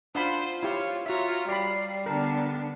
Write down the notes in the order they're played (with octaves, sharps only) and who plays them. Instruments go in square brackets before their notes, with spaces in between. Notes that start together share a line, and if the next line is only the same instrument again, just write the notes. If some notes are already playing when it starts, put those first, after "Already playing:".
[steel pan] D4 F#5 B5 [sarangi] F4 [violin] C5
[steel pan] E4 G4 [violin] C#5
[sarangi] F4 [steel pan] F#4 E5 [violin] C#5 A#5
[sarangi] G3 [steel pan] D5 G5 B5 [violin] C7
[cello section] D3 B3 D4 [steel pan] A#4 [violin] A5